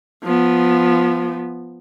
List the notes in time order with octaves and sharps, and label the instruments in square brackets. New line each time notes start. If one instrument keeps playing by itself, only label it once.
[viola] F3 B3